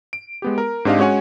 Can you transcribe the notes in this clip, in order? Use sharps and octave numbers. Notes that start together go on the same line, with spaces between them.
D7
G#3 B3 G4
A#4
G#2 C4 D4 G4 D#5 F5
G#3 C#4 F#4 C#5 F#5 G#5